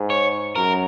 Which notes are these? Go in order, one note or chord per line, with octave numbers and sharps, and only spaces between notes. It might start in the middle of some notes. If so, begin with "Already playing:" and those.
Already playing: G#2
C#5
F#2 A#4